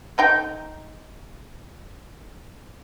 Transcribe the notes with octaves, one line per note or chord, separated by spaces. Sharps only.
A3 D#4 G5